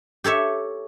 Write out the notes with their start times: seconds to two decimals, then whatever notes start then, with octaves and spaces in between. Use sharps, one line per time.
0.24 G4 A4 C#5 E5